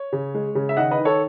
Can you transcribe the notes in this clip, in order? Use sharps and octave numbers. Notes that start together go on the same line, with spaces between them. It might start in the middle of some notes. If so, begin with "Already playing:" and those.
Already playing: C#5
C#3
G#3
C#3
E5
D#3 D#5 F#5
B4 D#5
D#3
A4 C#5